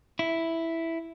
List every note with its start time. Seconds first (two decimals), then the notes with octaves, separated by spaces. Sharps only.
0.19 E4